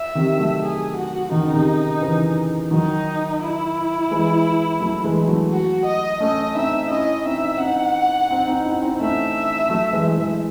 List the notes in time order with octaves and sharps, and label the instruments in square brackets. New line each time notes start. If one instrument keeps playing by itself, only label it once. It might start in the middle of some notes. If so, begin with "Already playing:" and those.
Already playing: [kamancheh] E5
[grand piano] C3 D#3
F#3 A3
[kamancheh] G#4
F#4
[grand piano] D#3 [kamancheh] D#4
[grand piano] C#3
C3 D#3
C#3 E3
[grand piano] D#3 F#3 [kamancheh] D#4
[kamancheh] E4
[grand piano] E3 G#3
F#3 A3
E3 G#3
F#3 A3
[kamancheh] F#4
D#5
[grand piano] A3 C#4 [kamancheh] D#5
[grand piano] C4 D#4 [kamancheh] E5
[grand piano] C#4 E4 [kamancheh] D#5
[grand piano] C4 D#4 [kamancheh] E5
[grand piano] C4 D#4 [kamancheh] F#5
[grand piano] C4 D#4
C4 D#4
C#4 E4
C4 D#4
C4
[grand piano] A3 C#4 [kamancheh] E5
[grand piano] F#3 A3
E3 G#3
E3 G#3